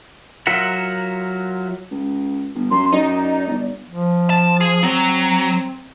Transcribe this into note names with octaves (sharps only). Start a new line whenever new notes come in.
F#3 F4 A#4 E5 F#5
C#2
G1
F#2 C6
F#2 D#4 D5
G1
F3
A5
G#4
F#3 C4